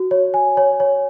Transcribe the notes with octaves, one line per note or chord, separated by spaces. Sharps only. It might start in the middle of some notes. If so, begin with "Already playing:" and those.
Already playing: F#4
C#5
G#5
C#5
C#5